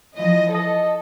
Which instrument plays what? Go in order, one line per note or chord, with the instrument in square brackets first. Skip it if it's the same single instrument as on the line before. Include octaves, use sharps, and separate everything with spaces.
[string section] E3 F3 D#5
[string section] A4 [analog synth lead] D#5